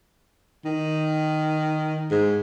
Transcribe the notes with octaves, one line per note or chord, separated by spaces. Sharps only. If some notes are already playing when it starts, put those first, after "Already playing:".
D#3
G#2